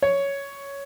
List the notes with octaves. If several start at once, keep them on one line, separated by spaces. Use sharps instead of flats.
C#5